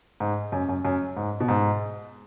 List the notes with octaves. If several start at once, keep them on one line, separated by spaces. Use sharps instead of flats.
G#2
F#2
F#2
F#2
G#2
B2
G#2